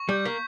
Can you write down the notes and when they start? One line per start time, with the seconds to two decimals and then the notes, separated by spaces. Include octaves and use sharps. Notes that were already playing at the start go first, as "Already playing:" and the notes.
Already playing: C#6
0.09 G3 G6
0.25 A#3 B6